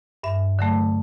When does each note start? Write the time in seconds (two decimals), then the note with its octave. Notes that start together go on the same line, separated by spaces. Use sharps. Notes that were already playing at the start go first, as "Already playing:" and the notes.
0.23 G2 E5
0.59 D3 F#3 A3